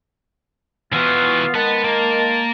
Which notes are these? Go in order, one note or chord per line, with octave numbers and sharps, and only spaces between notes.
E3 B3 F4 F#4
D#3 G#3 B4 F#5 A5
A#3